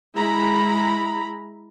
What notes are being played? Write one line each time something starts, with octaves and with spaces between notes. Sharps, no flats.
G#3 E4 A#5 B5